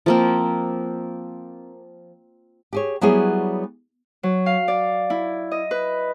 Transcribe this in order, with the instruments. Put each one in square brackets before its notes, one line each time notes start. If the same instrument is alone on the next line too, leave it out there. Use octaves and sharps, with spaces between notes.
[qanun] F3 A#3 C4
[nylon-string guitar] G4 G#4 C#5
F#3 G3 B3 E4 G#4 C#5
[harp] F#3
F5
D5
E4
D#5
B4